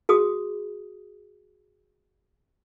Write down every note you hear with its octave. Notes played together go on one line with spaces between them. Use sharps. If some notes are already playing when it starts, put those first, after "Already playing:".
F#4 G#4 D#6